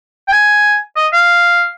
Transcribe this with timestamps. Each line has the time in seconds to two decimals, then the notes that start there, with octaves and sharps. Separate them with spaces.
0.28 G5
0.32 G#5
0.96 D#5
1.13 F5